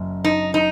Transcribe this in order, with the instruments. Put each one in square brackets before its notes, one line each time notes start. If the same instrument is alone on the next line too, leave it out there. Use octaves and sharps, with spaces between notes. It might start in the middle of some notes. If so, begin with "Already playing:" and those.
Already playing: [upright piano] F#1 F#2
[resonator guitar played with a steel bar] D#4
D#4